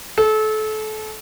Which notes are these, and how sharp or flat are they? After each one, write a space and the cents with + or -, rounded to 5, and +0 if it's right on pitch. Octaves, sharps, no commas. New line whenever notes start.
A4 -30